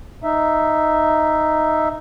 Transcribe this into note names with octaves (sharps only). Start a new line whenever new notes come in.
D#4 E5